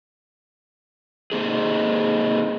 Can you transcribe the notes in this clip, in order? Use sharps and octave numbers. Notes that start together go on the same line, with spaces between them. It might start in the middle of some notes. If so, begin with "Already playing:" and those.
A#3 C4 D#4 G#4